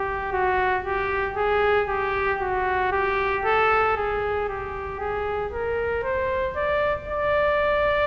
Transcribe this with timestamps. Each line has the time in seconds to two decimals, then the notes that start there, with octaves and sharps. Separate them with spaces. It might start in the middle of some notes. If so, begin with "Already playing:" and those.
Already playing: G4
0.33 F#4
0.85 G4
1.37 G#4
1.89 G4
2.41 F#4
2.92 G4
3.45 A4
3.97 G#4
4.48 G4
5.00 G#4
5.53 A#4
6.03 C5
6.56 D5
7.08 D5